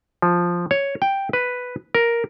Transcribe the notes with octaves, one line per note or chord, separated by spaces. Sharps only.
F3
C#5
G5
B4
A#4